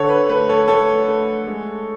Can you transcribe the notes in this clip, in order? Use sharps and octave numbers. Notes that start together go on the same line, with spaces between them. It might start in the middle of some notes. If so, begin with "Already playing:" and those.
Already playing: D3 A4 C#5
B4
A3 B4
A4 C#5
A3 A4 C#5
A3
G#3